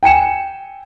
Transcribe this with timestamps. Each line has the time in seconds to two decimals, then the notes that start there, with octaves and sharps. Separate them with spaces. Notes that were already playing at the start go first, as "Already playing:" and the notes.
0.03 G5 G#5 C#7 E7